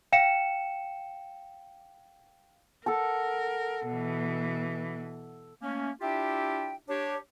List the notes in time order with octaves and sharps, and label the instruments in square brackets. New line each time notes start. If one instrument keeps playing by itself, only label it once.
[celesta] F5 G5 C#7 E7
[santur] A4 F#5 A5 [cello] A#4
[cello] B2 E3
[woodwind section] A3 A#3 C#4
D4 E4 F4 G4 E5 G5
D4 G4 C#5